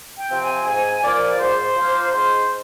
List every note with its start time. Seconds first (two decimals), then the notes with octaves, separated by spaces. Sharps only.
0.19 G5
0.31 C3 F3 C4
0.43 G#5
0.66 G#2 G#5
1.03 F3 A#3 D5
1.40 G#2 C5
1.76 F3 A#3
2.12 G#2 C5